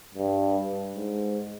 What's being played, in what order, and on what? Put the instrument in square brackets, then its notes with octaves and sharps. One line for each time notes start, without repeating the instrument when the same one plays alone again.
[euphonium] G2
G#2